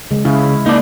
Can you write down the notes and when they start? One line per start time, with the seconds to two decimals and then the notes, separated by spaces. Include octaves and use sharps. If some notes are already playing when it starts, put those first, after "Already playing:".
0.11 C#3 G#3
0.25 C#3 E4
0.66 A#3 D#4 D5